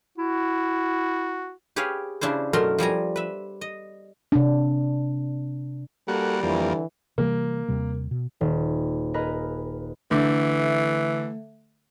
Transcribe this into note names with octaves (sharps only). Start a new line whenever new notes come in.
E4 F#4
G4 G#4 B4 C#5 F5
C#3 D4 E4 C5
F#2 B2 A3 A#4 A#5 C6
F3 G3 G#5 A#5
B4 E5
D#5
C3 D4
G3 A#3 F#4 A4
F2 D3 E3 A#3
C3 E3 G3 A#3
D#2 C3 G3
B2
D#1
G#4 A#4 B4 D#5 A#5
D3 E3 A3